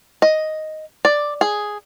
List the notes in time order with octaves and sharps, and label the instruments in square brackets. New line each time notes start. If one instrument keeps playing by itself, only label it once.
[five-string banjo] D#5
D5
G#4